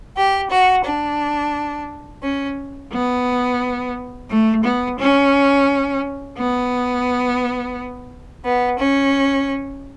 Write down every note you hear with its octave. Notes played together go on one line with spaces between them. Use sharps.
G4
F#4
D4
C#4
B3
A3
B3
C#4
B3
B3
C#4